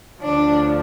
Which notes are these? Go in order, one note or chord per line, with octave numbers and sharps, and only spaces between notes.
D2 D3 F3 D4